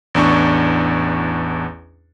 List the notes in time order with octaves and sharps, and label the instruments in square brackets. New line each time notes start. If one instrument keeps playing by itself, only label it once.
[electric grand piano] A1 E2 D4 C#6